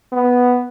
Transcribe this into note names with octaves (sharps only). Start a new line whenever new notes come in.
B3